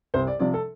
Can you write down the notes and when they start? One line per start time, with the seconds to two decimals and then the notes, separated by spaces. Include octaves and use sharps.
0.14 C2 C5
0.27 D5
0.39 C3 F3 D5
0.54 A4